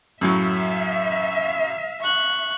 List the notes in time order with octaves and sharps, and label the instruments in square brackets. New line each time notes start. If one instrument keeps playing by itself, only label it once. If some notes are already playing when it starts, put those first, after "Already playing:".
[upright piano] F#2 A2 F#3 [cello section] E5 F5
[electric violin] C#6 F#6